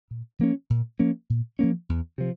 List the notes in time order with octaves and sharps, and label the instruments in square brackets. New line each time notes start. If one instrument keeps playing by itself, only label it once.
[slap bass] A#2
F3 A#3 C#4
A#2
F3 A#3 C#4
A#2
F3 A#3 C#4
E2
C3 F3